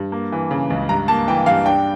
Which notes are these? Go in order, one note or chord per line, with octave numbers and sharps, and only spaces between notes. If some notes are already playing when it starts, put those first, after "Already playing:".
Already playing: G2
A#3
E3
C#3
C#2
G2 A#5
A#3 A5
E3 G5
G2 F5
D4 G5